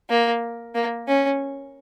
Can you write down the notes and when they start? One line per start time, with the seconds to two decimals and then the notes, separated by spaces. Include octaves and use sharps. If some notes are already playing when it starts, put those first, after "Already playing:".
0.10 A#3
0.75 A#3
1.08 C#4